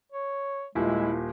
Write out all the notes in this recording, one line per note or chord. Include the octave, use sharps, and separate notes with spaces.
C#5
D#1 A#2 G#3 E4